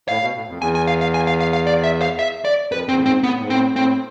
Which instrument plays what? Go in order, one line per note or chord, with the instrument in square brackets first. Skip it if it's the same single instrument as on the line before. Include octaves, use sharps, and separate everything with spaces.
[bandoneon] A2 [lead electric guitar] F5
[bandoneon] B2
A2
F2
[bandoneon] E2 [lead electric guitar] G#5
[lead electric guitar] G#5
F5
F5
G#5
F5
F5
F5
D5
E5
F5
E5
D5
[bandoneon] F2 [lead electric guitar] B4
[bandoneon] E2 [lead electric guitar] C4
[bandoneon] A2
[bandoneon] G#2 [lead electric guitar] C4
[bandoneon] A2 [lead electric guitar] B3
[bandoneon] G#2
[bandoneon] A2 [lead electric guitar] C4
[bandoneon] A2 [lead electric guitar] C4